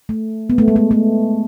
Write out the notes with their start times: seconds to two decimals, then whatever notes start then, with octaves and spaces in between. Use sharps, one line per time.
0.09 A3
0.50 B3
0.58 A3
0.68 G#3
0.76 A3
0.91 A3